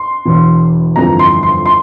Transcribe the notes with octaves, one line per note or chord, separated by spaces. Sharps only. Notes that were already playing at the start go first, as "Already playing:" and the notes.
Already playing: C6
E1 E2 E3
G1 F2 E3 A#5
C6
C6
C6